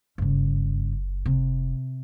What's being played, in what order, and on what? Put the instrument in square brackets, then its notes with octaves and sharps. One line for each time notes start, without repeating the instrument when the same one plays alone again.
[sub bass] F#1 [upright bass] G2 C#3
[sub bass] F1 [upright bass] C3